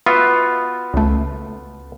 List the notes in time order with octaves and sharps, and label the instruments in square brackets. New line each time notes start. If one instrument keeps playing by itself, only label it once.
[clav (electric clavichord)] B3 F4 F#4 [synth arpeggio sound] E5
[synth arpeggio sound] C#2 A3